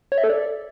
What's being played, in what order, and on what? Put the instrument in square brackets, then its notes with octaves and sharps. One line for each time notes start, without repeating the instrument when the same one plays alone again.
[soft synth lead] C#5
E5
A4
D5